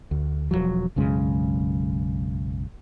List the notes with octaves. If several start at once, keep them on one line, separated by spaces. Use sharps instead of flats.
D2
E1 F2 F3 F#3
B1 F#2 C#3 G#3